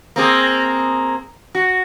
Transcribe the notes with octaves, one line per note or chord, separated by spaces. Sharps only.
A#3 C4 G#4
F#4